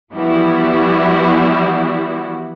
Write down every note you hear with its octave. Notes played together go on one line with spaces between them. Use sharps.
E3 F3 G3 B3 E4 F#4